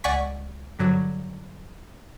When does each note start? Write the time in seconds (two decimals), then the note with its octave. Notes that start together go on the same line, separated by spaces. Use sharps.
0.04 C#2 D5 F#5 G#5 C#6 B6
0.79 G2 D3 F#3